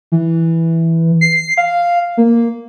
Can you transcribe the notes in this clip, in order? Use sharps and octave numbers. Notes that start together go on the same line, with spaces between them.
E3
C7
F5
A#3